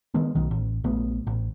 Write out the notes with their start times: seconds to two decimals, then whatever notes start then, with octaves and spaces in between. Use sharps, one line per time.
0.14 D#3 G#3 B3
0.35 B1 D#3
0.51 A1
0.84 A#1 A3 B3
1.27 A1